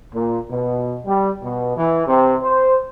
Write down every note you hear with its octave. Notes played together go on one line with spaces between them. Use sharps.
A#2
B2
G3
B2
E3
C3
C5